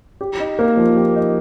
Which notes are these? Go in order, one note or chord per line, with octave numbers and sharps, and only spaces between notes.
G4
D#4
A#3
F3
G4
D#4